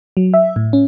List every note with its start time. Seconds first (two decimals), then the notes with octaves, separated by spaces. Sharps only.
0.17 F#3
0.34 E5
0.56 A2
0.73 C#4